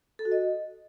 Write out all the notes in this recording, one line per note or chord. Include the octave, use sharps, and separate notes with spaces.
A4
F#4
D#5